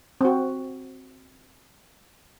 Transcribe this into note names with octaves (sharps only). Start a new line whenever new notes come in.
C4 F#4